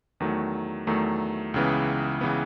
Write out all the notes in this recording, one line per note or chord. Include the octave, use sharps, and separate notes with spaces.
E2 D#3 F#3 A3
E2 D#3 F#3 A3
C#2 C#3 E3 B3
C#3 E3 B3